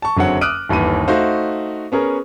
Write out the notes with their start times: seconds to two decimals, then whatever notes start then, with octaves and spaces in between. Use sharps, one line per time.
0.02 A5 C#6
0.17 F#1 D3 F#3 C4 C#5 F#5
0.41 D6 D#6 F6 F#6 D7 D#7
0.69 G1 D#2 E3 B5 D#7
1.08 A3 D#4 F#4 C5 F5
1.92 B3 C#4 G#4 A#4